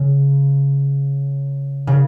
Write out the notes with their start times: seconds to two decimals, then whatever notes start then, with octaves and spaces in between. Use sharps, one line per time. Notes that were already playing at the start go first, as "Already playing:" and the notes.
Already playing: C#3
1.87 C#3